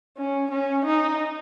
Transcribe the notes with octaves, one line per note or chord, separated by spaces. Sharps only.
C#4
C#4
D#4